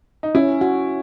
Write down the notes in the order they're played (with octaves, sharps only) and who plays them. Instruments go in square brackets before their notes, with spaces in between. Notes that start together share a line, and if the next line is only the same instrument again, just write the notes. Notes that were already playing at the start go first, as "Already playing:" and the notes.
[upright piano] D#4
[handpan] C#4 [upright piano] E4
[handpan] F#4